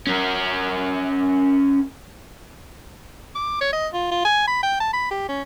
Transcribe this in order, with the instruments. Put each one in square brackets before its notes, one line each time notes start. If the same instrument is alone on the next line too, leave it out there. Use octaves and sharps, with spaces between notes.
[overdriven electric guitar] C#4 A#4
[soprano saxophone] D6
C#5
D#5
F4
F4
G#5
B5
G5
A5
B5
G4
C#4